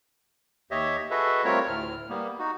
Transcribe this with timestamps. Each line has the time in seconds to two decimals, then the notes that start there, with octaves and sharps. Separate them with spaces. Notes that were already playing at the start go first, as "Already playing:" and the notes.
0.71 D#2 G4 C#5 D#5 E5
1.11 F#4 G#4 A4 B4 D#5 E5
1.45 G3 A3 C4 F4 A#4 C#5
1.68 D2 A2 F6
2.09 G3 A#3 B3
2.39 D#4 F#4